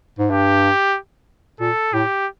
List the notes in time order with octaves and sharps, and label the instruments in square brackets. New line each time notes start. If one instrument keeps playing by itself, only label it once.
[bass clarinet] G#2
[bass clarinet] G2 [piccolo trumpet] G4
[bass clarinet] A#2 [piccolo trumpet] A4
[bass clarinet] A2 [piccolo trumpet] G4